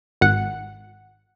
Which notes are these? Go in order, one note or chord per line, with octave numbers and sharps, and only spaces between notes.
G#1 F#5